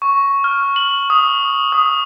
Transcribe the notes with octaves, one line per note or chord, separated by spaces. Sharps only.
C#6
F6
F#7
D#6
D#6